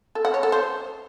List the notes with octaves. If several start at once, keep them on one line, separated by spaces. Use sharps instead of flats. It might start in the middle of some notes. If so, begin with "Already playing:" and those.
A4
F#5
C#5
A4
C5